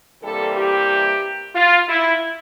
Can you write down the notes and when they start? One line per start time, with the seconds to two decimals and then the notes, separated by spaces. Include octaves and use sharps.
0.22 C3 E3 G3 A#3 A4
0.56 G4
1.54 F4
1.87 E4